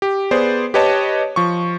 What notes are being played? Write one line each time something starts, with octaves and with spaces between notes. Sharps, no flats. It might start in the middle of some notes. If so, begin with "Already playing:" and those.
G4
B3 G#4 C5 D5
G4 B4 C#5 D#5 A5
F3 C#6